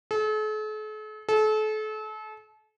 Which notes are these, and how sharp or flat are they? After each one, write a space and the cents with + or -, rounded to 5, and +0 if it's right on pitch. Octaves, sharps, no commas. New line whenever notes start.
A4 -45
A4 -35